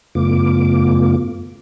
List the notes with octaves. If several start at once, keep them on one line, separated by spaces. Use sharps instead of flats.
F#2 C#3 A3 B3 F4 D6